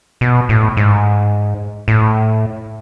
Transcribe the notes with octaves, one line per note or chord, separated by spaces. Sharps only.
B2
A2
G#2
A2